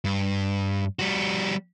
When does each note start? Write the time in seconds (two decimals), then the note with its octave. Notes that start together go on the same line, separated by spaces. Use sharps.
0.05 G2
0.99 G3 F#4